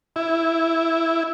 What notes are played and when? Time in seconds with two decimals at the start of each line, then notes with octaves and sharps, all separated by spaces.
0.16 E4